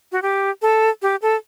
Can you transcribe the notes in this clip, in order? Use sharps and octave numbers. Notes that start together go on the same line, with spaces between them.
F#4
G4
A4
G4
A4